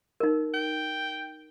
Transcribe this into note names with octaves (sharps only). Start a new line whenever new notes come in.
D#4 A#4
G5